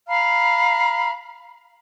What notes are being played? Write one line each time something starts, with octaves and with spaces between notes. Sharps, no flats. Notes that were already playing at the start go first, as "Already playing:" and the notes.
F5 A#5 B5 F6